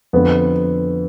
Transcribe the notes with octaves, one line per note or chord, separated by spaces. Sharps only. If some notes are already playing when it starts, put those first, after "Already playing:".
F2 D3 B3